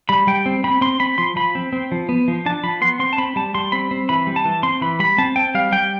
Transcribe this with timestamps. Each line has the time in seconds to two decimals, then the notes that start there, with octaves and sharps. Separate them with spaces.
0.09 G3 B5
0.27 G3 G5
0.46 C4
0.64 C4 B5
0.81 C4 C6
1.00 C4 B5
1.18 F3 C6
1.36 F3 B5
1.55 C4
1.73 C4
1.92 F3
2.09 B3
2.28 F3
2.46 D4 A5
2.63 F3 B5
2.81 B3 C6
2.99 C4 C6
3.13 A5
3.18 C4 B5
3.36 G3 A5
3.55 G3 C6
3.72 C4 B5
3.91 C4
4.09 E3 B5
4.27 G3
4.36 A5
4.45 E3
4.63 C4 C6
4.81 E3 B5
5.00 G3 B5
5.18 C4 A5
5.36 C4 G5
5.55 G3 F5
5.72 G3 G5